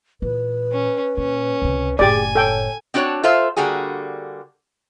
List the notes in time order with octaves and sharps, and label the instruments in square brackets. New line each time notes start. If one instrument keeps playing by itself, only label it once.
[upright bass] A#2 E3 [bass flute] B4
[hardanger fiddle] C#4
[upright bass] A#2 [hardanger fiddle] C#4
[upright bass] C#2 C3
[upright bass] F#1 A2 [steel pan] G4 D5 [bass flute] G#4 [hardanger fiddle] G#5
[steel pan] A4 G5 [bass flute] C#5
[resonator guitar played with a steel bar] C4 D4 F#4 A4 C#5 A5
F4 A4 C5 E5 F5
D3 G3 A#3 F#4 G#4